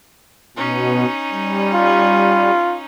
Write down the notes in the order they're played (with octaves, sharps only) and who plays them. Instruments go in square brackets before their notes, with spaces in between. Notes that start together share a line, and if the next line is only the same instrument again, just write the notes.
[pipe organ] B2 [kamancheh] C#4 D#4
[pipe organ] G3
[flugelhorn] F4